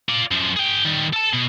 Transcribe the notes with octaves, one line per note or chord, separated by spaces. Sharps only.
F4 D5
F#2 F3
G#4 G5
D#3 G3
A4 A5
B2